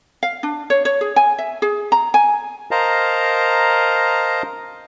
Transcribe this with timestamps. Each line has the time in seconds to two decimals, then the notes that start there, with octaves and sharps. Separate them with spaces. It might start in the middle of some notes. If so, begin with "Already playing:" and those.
0.23 F5
0.43 D4
0.70 C#5
0.85 C#5
1.01 G#4
1.16 G#5
1.39 E5
1.62 G#4
1.92 A#5
2.14 G#5
2.71 A#4 C5 D#5 F5 A5 A#5